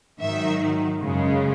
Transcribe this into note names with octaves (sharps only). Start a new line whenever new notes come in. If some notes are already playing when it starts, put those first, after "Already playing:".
G#2 D#3 F#3 E5
F#2 C#3 G#3